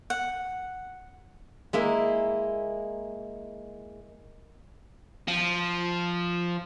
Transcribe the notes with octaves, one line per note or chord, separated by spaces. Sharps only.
F#5
G#3 A#3 E4
F3